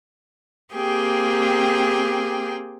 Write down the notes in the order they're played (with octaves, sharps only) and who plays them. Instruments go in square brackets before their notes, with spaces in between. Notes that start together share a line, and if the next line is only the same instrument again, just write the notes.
[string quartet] A#3 C4 G4 G#4 G5